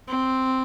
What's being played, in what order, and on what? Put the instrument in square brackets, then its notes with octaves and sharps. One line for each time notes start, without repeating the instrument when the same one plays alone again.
[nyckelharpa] C4